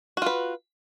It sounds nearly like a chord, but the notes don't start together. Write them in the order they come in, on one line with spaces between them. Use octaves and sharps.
F#4 F4 B4